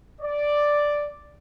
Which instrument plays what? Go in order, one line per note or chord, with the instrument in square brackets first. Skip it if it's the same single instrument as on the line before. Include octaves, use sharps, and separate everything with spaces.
[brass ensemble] D5